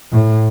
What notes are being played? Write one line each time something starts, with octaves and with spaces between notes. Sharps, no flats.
A2